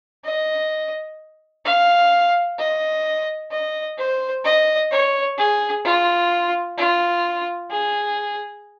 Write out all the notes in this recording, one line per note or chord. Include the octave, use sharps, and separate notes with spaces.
D#5
F5
D#5
D#5
C5
D#5
C#5
G#4
F4
F4
G#4